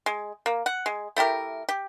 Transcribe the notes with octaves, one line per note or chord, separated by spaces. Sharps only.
G#3
A#3
F#5
G#3
A3 E4 G4 A#4
G4